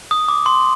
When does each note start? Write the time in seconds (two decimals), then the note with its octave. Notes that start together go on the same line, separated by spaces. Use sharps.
0.11 D#6
0.28 D6
0.46 C6